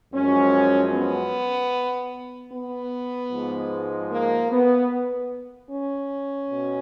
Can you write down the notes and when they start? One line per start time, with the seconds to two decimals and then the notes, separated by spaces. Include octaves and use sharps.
0.13 F#2 F3 G#3 C#4
0.93 B3
2.52 B3
3.32 G#2 F3 G#3
4.11 A#3
4.51 B3
5.71 C#4
6.50 B2